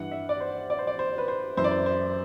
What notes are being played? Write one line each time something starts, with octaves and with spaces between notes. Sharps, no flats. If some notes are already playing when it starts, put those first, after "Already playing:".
Already playing: G2 E3 F#5
E5
D5
C5
D5
C5
D5
C5
B4
C5
F#2 E3 C5
D5
C5
C5